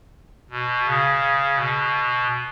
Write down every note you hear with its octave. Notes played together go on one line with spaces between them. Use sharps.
B2
C#3
B2